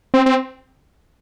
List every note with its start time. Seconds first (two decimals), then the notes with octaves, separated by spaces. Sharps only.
0.14 C4
0.26 C4